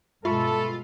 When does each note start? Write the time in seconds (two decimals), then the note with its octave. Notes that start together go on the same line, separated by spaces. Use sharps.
0.25 G2 B2 G#3 F4 A4 E5 B5 C#6